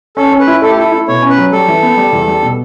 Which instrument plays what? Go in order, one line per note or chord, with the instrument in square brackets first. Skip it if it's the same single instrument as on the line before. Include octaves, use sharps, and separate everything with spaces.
[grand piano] C#4 [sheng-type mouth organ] A4
[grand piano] C#4
[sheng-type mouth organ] B4
[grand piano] E4
[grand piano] A3 [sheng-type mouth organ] A4
[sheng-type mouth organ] G4
[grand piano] E4 [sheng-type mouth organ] A4
[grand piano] E4
[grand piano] B2 [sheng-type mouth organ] C#5
[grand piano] C#4
[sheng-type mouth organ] B4
[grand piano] F#3
[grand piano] G3 [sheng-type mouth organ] A4
[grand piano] E3
B3
G3
E2
G3
B2